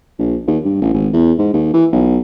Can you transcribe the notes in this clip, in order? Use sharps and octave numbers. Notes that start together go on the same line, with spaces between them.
A#1
D#2
G2
A1
G#1
E2
G#2
D#2
E3
B1